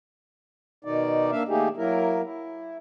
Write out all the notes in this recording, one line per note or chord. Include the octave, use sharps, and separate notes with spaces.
B2 D#3 D#4 D5
A#3 D4 E5 F5
D#3 A3 A#3 D#4 G4 G#4
F#3 A#3 E4 A#4
E4